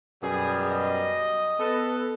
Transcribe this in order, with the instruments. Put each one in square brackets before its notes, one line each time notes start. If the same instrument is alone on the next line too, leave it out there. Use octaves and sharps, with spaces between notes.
[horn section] F#2 B2 G3 [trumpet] G#4
[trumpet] D#5
[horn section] B3 A4 B4